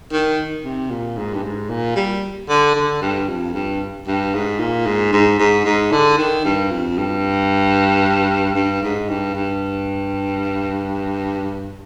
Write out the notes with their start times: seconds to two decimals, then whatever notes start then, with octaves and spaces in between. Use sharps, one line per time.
0.12 D#3
0.64 C3
0.90 A#2
1.17 G#2
1.34 G2
1.44 G#2
1.69 A#2
1.96 G3
2.49 D3
2.75 D3
3.02 G2
3.28 F2
3.54 G2
4.07 G2
4.34 G#2
4.59 A#2
4.86 G#2
5.13 G#2
5.39 G#2
5.65 G#2
5.91 D3
6.18 D#3
6.45 G2
6.71 F2
6.98 G2
8.55 G2
8.82 G#2
9.09 G2
9.35 G2